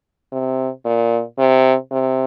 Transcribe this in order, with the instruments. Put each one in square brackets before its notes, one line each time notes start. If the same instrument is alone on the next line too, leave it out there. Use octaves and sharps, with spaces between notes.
[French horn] C3
A#2
C3
C3